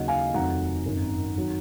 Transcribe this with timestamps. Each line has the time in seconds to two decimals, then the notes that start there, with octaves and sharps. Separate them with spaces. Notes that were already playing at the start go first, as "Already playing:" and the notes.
Already playing: D#2 C#3 F#3 D#5 F#5
0.08 F5 G#5
0.34 F1 F2 D#3 F#3 F#5 A#5
0.85 G#1 F#2 D#3
1.37 D#3 F#3